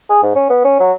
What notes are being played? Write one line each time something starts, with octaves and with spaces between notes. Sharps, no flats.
G#4
G#2
C#4
B3
C#4
F#3